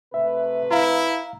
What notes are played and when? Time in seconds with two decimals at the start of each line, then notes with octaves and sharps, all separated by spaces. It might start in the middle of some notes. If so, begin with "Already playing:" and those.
0.14 C3 A3 B4 E5
0.71 E4 F5 A#5